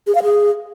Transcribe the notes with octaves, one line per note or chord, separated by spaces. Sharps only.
G#4
F5
G#4